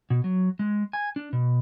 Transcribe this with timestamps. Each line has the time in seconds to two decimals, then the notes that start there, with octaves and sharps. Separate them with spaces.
0.10 B2
0.24 F#3
0.59 G#3
0.93 G#5
1.16 D4
1.33 B2